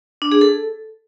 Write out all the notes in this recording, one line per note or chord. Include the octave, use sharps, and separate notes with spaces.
D4
G#4
A4